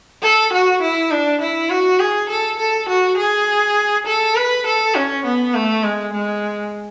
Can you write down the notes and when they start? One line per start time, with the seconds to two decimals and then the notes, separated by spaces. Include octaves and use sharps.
0.23 A4
0.53 F#4
0.82 E4
1.11 D4
1.41 E4
1.70 F#4
1.99 G#4
2.30 A4
2.59 A4
2.89 F#4
3.17 G#4
4.06 A4
4.36 B4
4.66 A4
4.95 C#4
5.25 B3
5.55 A3
5.83 G#3
6.13 G#3